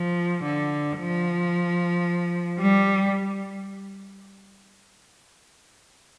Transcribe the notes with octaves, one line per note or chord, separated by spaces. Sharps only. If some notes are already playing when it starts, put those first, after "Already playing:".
Already playing: F3
D3
F3
G3